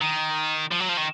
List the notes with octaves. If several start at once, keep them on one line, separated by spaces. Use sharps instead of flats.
D#3
F3
F#3
F3
D#3